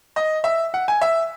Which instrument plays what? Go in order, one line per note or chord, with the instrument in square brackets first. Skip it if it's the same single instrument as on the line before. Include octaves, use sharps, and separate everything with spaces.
[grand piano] D#5
E5
F#5
G#5
E5